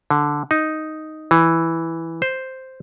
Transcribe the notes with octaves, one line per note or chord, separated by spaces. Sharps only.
D3
D#4
E3
C5